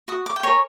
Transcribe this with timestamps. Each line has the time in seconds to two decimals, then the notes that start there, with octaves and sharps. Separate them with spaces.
0.08 F#4 D#6
0.26 D6
0.36 G5
0.43 A#4 C#5 G#5